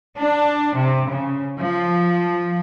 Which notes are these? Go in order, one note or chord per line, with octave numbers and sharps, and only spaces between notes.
D4
C3
C#3
F3